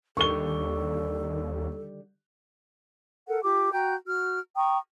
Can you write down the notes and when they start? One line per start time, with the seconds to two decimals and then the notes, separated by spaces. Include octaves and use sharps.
0.17 D#2 D3 D#3 G3 A4 C#6 G7
3.28 A4 A#4 F#5
3.43 F4 G4 D6
3.72 F#4 G5 A#5 G6
4.07 F#4 F6
4.56 G5 A#5 C#6 D#6